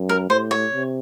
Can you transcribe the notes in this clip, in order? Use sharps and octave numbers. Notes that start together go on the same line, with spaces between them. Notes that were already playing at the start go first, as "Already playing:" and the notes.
Already playing: F#2
A#4
A2 C5
C#5
C3